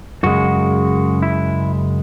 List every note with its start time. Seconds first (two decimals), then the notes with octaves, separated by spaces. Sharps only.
0.23 F#2 C#3 G#3 F#4
1.22 E4